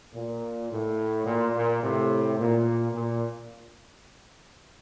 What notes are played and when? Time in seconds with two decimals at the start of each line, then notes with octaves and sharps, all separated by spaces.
0.14 A#2
0.70 A2
1.25 A#2
1.53 A#2
1.82 A2 C3
2.38 A#2
2.93 A#2